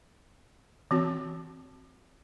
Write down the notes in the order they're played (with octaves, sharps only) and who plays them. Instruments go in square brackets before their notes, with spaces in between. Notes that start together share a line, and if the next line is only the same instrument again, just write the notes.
[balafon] E3 C4 F#4